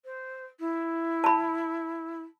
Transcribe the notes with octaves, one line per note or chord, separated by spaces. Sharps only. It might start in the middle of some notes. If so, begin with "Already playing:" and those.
C5
E4
A5 B5